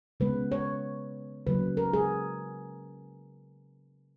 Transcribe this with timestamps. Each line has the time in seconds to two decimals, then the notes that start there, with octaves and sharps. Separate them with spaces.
0.20 C#3 G#3 B3 B4
0.52 C#5
1.47 C#3 F#3 A#3 B4
1.77 A#4
1.93 G#4